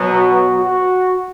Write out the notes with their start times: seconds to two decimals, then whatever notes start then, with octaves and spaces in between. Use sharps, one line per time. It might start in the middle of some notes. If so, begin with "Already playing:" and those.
Already playing: B2 F#3 B3
0.14 F#4
0.61 F#4